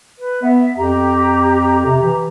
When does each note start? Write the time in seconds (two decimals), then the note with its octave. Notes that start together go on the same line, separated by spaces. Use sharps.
0.20 B4
0.43 B3 E5
0.77 F2 G4 A#5
1.86 C3
2.03 E3